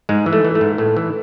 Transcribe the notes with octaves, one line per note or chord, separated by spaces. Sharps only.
G#2 G#3
E3
A3
E3
A3
G#2
A2 A3
E3